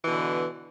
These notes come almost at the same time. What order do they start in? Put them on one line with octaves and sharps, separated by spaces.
E3 B2 D3